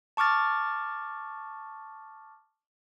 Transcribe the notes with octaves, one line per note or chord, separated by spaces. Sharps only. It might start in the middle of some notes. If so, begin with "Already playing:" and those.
A5 C#6 D6 F6 A6